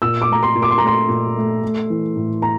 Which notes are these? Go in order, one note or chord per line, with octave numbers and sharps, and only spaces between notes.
A#2 E6
D6
A3 A#5
C6
A#2
D6
C6
A#5
A3
C6
A#2
A3
A3
E3
A2
A#5